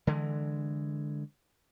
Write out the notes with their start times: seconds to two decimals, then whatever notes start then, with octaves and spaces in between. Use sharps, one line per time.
0.07 D3 E3 G#3